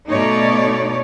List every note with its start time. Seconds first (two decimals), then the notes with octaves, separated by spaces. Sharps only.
0.10 B2 A3 D#4 C#5 D5